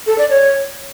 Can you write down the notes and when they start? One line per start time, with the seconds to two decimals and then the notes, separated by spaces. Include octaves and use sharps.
0.07 A4
0.18 D5
0.30 C#5